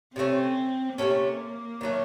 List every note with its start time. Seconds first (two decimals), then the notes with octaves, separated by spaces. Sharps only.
0.16 C3 F3 A3 C4 C#4
0.98 C3 F3 A3 A#3 C#4
1.81 D#3 F#3 A3